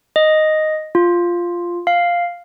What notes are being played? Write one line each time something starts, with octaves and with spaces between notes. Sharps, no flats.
D#5
F4
F5